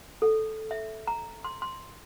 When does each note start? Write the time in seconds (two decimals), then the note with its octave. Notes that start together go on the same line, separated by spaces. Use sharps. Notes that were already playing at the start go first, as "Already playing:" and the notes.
0.22 A4
0.71 E5
1.07 A#5
1.44 C6
1.62 C6